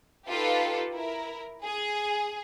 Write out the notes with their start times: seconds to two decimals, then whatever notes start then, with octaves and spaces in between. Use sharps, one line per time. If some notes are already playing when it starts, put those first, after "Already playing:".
0.29 D#4 F4 G4 A4 B4
0.93 E4 A#4
1.64 G#4